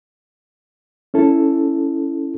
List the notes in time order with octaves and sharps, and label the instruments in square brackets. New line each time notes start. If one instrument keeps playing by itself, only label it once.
[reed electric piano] C#4 E4 A4